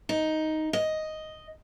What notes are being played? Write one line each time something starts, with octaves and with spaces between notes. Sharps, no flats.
D#4
D#5